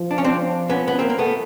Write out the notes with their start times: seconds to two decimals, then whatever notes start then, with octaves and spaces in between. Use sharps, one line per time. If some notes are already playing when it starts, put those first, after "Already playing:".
Already playing: F3
0.11 D4
0.18 C#4
0.24 C4 D4
0.70 B3 C#4
0.88 B3
0.99 A#3 C4
1.10 A#3
1.19 A3 B3